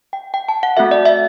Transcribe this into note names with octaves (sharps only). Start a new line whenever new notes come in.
G5
G5
A5
F#5
A3 C4 F#4 A4 E5
D5
E5